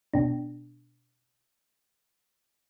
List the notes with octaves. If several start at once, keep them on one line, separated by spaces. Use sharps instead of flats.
B2 D4